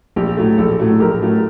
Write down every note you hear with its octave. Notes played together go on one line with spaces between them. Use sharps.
A#1 G4
A2 F#3 A3
A#1 A4
A2 F#3 A3
A#1 G4 A#4
A2 F#3 A3